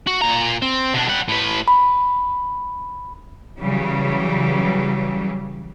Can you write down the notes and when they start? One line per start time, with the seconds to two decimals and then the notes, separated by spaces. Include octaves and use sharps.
0.07 F#4
0.21 A#2 A#5
0.62 C4
0.94 B2 D4
1.08 G3 F#5
1.29 A2 B4
1.68 B5
3.61 C#3 E3 F#3 G3